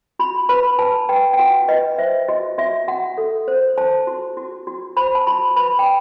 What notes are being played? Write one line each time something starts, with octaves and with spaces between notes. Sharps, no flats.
F#4 B5
B4 B5
B4 A5
B4 G5
G5
F#4 F#5
B4 D#5
C5 E5
F#4 D#5
F#4 E5
F#4 F#5
A4
C5
C5 A5
F#4
F#4
F#4
C5 B5
A5
F#4 B5
B4 B5
G5